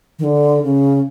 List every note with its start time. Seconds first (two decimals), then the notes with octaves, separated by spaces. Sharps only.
0.19 D#3
0.24 D3
0.63 C#3